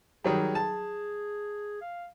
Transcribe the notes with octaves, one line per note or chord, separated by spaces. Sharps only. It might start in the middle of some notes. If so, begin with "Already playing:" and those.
D#3 F#3 G3 G#4
A5
F5